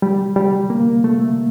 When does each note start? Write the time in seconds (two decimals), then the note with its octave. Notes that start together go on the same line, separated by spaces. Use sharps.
0.02 G3
0.36 G3
0.70 A#3
1.04 A3